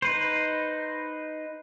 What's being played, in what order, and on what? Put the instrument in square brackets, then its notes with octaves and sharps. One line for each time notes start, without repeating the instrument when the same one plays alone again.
[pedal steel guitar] D#4 B4 C5